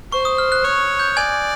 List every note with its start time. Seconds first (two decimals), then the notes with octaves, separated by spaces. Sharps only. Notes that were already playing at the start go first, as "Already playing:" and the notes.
0.12 C5 C#6
0.25 D#6
0.38 F6
0.52 F#6
0.64 C#5 F#6
0.99 G6
1.17 D5 G#5 G#6